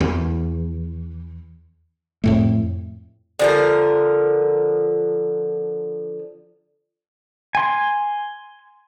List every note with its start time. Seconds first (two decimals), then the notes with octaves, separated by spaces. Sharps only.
0.01 E2
2.24 F2 A2 A3
3.39 D3 F3 A#4
7.55 G#5 C6